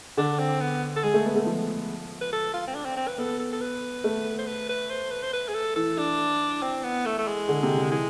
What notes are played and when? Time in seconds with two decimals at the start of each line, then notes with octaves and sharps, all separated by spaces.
0.17 D3 D4
0.39 C4
0.61 B3
0.96 A4
1.03 G#3 G#4
1.14 A3
1.25 B3
1.36 A3
1.46 F3
2.21 B4
2.33 A4
2.54 F4
2.67 C4
2.75 D4
2.85 C4
2.96 C4
3.07 B4
3.18 B3 A4
3.39 A4
3.52 A4
3.61 B4
4.04 A3
4.39 C5
4.47 B4
4.69 B4
4.90 C5
5.11 B4
5.23 C5
5.33 B4
5.48 G#4
5.54 A4
5.76 E3 A4
5.98 D4
6.62 C4
6.84 B3
7.06 A3
7.18 A3
7.27 G#3
7.49 D3
7.63 C3
7.77 D3
7.91 E3 G#3